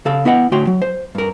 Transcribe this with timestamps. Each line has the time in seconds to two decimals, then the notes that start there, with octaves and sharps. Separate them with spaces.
0.05 C#3 A4 F5
0.25 B3 E4 D#5 F#5 G5
0.52 D2 A2 F#4 C#5 G5 C6
0.67 F#3
0.82 C5
1.15 G2 A#4